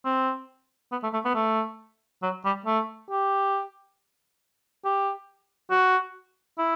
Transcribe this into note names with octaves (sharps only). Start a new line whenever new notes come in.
C4
B3
A3
A3
B3
A3
F#3
G3
A3
G4
G4
F#4
E4